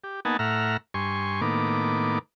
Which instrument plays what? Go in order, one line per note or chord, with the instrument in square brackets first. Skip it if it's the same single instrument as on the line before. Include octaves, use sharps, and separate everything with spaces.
[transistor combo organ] G4
A#3 B3 D#4 F#5 G#5 A5
A2 E5 F#5 A#5 F6
G2 G#5 C6 C#6
A2 D#3 A#3 B3 D6